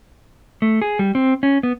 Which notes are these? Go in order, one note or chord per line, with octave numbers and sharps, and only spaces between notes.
A3
G#4
G3
C4
C#4
B3